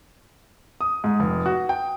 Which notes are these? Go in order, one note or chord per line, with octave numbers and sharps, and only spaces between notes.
D#6
G#2
F1
F#4
G5